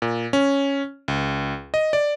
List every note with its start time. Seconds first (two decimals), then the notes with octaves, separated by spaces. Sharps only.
0.02 A#2
0.33 C#4
1.08 C#2
1.74 D#5
1.93 D5